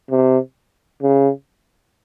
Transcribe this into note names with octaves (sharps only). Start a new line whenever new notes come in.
C3
C#3